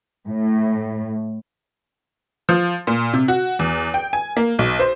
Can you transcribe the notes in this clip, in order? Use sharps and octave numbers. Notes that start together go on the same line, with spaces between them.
A2
F3
A#2
C3
F#4
E2
G5
G#5
A#3
B1
C5